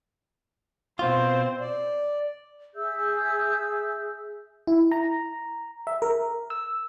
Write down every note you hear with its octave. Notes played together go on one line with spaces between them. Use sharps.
B2 C4 F4 C5
D5
G#4 E5 E6 G6
E4
A#5
E5
A#4
E6